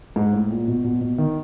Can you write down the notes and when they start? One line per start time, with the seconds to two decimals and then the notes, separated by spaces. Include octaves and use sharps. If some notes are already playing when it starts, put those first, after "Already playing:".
0.16 G#2
0.33 A2
0.50 A#2
0.68 B2
0.84 B2
1.01 B2
1.18 D#3